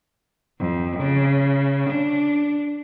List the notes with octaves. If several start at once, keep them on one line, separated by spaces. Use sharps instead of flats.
F2
C#3
D4